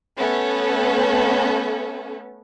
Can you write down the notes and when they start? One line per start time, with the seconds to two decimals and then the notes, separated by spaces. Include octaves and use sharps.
0.18 A3 B3 C#4 A4